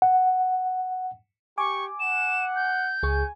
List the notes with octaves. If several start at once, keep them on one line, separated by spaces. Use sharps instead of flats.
F#5
G4 G#5 C#6 D6
F#5 E7
G6
C#2 G#4 G#5 C#6